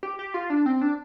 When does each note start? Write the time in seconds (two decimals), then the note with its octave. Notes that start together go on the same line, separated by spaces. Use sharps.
0.03 G4
0.19 G4
0.34 F4
0.50 D4
0.66 C4
0.82 D4